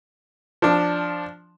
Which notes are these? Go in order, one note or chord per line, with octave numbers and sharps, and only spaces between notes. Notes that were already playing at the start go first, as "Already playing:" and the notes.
F3 D4